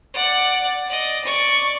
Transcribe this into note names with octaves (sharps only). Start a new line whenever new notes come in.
D5 F#5
D5 D#5
D5 C#6